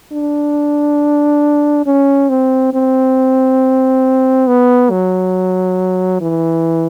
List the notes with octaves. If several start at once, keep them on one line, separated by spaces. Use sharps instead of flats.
D4
C#4
C4
C4
B3
F#3
E3